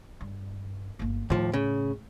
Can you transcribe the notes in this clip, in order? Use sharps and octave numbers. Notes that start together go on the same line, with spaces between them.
G2
G1 A#3
D#2 A2 F3
C#3